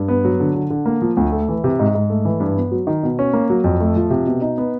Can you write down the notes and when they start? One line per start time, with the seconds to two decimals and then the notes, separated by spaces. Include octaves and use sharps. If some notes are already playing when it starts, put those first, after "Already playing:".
Already playing: G2
0.08 B3
0.25 F#3
0.40 D3
0.55 D3
0.70 D3
0.86 A#3
1.02 F3
1.17 D2
1.32 A3
1.48 E3
1.64 C3
1.79 G#2
1.95 G#2
2.10 A3
2.25 E3
2.40 G2
2.56 B3
2.71 F#3
2.87 D#3
3.03 B2
3.19 C#4
3.33 A#3
3.50 F#3
3.64 F2
3.80 A3
3.96 F3
4.10 C3
4.26 B2
4.41 D#4
4.58 B3